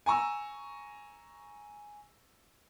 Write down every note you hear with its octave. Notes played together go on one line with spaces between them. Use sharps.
G#5 A#5 C#6 E6